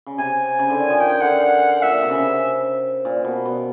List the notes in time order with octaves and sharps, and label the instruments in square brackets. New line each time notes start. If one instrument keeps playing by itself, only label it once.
[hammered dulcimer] C#3
[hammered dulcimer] C3 [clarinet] G#5
[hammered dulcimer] C#3
D3
D#3
F3
[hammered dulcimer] D#3 [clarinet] G5
[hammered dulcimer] D3 [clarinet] F#5
[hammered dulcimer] A#2 [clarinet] E5
[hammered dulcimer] C3
C#3
C3
A#2
B2
B2